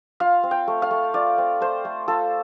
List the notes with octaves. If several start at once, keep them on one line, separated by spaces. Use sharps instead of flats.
F4 F5
C4
G5
A3
F5
A3
F4 D5
C4
A3 C5
A3
F4 A4